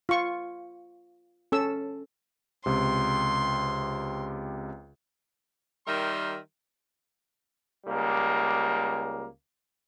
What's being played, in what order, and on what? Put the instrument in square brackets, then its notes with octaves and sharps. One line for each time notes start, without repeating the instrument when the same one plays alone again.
[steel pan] F4 C#6
C#4 A4 E6
[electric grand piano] C#2 C3 [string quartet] C6
[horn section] D#3 G3 A#4 E5 C6
[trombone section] C#2 G3 A#3